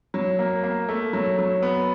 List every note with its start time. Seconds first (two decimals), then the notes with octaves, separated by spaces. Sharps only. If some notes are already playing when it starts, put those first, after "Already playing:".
0.14 F#3
0.39 A#3
0.64 A#3
0.89 A3
1.13 F#3
1.39 F#3
1.62 B3